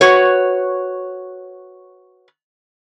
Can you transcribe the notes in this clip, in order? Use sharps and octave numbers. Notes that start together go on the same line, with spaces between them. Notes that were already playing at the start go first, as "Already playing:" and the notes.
F#4 B4 C#5